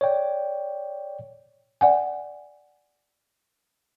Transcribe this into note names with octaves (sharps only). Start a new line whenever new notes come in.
C#5 D5 G5
D5 F#5 G#5